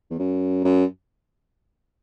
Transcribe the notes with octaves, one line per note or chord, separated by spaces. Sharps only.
E2
F#2
F#2